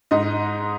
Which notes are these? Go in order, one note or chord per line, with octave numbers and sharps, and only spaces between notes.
G#2 D#4 D#5